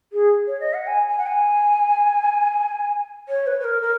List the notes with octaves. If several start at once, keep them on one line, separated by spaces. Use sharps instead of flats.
G#4
C#5
D#5
F#5
G#5
G#5
F#5
G#5
C#5
B4
B4
A#4
A#4